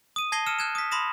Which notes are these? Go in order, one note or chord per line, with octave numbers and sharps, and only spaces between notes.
D#6 D#7
A5 G#6 A#6 C7 D#7 G7
E6 F6 C#7 D#7 E7
F#6 G#6 E7
D#6 B6
B5 C6 D#6 A#6 E7